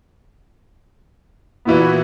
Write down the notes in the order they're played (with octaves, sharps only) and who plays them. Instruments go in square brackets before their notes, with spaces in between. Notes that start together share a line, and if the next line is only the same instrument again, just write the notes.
[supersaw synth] A#2 E4 F#4 [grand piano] E3 B3